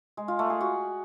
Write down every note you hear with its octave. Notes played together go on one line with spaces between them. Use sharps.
G#3
F4
A3
G#4
F#4